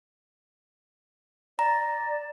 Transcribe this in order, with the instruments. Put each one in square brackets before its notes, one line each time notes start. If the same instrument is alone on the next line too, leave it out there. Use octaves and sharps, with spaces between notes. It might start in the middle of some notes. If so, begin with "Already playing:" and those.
[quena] D5 [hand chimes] A#5